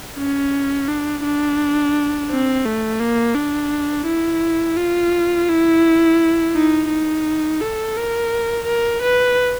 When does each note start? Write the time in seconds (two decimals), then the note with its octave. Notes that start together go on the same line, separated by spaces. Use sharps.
0.18 C#4
0.88 D4
1.24 D4
2.30 C4
2.65 A3
3.00 A#3
3.35 D4
4.07 E4
4.77 F4
5.49 E4
6.54 D#4
6.89 D#4
7.61 A4
7.97 A#4
8.67 A#4
9.02 B4